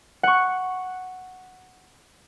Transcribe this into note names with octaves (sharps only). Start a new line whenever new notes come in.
F#5 C#6